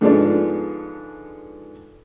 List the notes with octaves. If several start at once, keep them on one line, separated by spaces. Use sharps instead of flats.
G#2 D3 F3 G#3 B3 D4